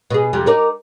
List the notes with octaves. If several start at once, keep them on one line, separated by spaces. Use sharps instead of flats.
B2 G#4
F2 C3 G3
D#4 A#4 D5